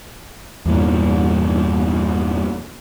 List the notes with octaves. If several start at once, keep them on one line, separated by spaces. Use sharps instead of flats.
E2 G2 A#2 E3